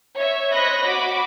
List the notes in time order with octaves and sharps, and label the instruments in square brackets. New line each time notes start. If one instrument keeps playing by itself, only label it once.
[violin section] C#5 E5
C5 C#5 D#5 B5 F#6 A#6
F#4 B5 D6